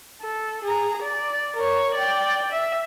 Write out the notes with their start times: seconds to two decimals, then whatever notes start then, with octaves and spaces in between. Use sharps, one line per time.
0.22 A4
0.64 G#4 A#5
1.02 D5
1.56 A#4 C#5
1.95 D5 G5
2.51 E5